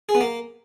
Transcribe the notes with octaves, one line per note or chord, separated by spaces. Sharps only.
G#4
B3
A#3